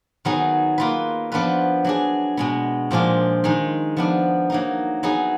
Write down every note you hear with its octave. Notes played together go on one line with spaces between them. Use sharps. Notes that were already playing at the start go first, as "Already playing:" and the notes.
D#3 F#3 B3 D#4 G#4
A#3 F4 B4
F3 B3 D4 F4 B4
F#3 D4 G#4
B2 G#3 B3
A#2 F3 G#3 D4 F4
D#3 G#3 D#4
F3 B3 D4
F#3 A#3 D#4
F#3 B3 D#4 G#4